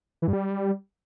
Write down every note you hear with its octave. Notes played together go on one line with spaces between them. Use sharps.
E3
G2
G3